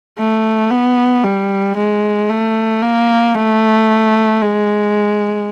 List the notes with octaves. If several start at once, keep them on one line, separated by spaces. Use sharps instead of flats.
A3
B3
G3
G#3
A3
A#3
A3
G#3